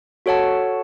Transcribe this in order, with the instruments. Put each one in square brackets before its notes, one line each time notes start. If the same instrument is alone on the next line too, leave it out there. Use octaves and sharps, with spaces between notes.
[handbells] F#4 A4 C#5 F#5 A5